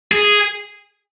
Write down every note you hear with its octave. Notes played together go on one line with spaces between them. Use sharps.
G#4